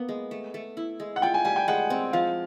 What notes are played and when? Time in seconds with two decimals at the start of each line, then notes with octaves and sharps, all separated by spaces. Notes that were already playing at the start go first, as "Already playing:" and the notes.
Already playing: A#3 B3 B4
0.09 G#3
0.31 A3
0.54 A3
0.77 E4
1.00 G#3
1.16 F#5
1.22 F4 G5
1.34 G#5
1.45 G3 G#5
1.56 G5
1.68 G#3 F#5
1.90 C4
2.13 F3 F5